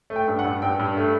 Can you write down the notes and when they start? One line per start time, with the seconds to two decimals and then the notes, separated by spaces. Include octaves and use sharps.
0.10 A3
0.16 G5
0.28 G2
0.39 F#5
0.44 G2
0.62 G2 G5
0.79 G2
0.97 A3